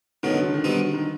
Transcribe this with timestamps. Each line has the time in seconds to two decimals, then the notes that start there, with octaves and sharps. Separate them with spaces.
0.23 B2 D#3 F#3 A3
0.33 D3
0.43 D3
0.54 D#3
0.64 B2 G3 C4 D#4
0.94 D#3